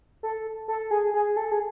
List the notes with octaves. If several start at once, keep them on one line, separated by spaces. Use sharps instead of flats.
A4
A4
G#4
G#4
A4
G#4